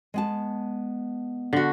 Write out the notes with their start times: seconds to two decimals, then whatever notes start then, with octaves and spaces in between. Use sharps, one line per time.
0.14 G#3 B3 A5
1.53 D3 F#4